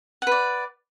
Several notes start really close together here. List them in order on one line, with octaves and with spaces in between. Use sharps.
F#5 B4 D5